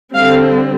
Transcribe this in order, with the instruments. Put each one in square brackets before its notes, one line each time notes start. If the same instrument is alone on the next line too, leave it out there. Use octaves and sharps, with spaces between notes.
[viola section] D3 G3 C4 F5